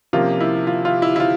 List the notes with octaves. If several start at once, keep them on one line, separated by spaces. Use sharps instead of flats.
C3 F3 A#3 C#4 F4
E4
F4
F4
E4
E4
F4